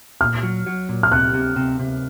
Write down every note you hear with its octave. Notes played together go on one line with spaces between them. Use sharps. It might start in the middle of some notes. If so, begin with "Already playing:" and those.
A#2 F6
F#3
F#3
A#2
F6
C3 F#6
C3
C3
C3